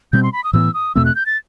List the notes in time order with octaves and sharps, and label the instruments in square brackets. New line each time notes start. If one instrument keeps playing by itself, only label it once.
[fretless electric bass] B2 G3 C4 [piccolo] G6
[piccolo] C6
B5
D#6
[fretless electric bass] A2 E3 B3 [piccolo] E6
[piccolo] D#6
[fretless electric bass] E2 B2 A3 C4 [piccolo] E6
[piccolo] F#6
G6
A6